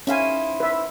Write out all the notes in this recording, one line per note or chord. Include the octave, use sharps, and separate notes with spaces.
C#4 D#4 E4 C5 F5 G#5
B4 E5